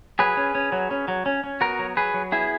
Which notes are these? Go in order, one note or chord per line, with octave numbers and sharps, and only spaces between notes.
F#3 G#4 B4
C#4
C#4
F#3
C#4
F#3
C#4
C#4
B3 F#4 A#4
F#3
F#3 G#4 B4
F#3
B3 E4 G#4